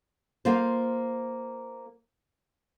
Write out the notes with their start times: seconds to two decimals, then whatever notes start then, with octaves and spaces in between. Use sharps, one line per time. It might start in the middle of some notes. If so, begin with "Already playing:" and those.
0.45 A#3 F4 C5